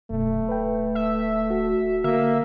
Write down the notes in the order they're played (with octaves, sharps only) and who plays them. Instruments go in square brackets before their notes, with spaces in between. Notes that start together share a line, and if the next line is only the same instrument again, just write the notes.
[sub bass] D1 [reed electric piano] F#2 B2 [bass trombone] A3
[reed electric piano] B4 G5
[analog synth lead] E5
[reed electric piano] F#4 A4
[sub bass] D3 [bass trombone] A#3 [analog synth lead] E5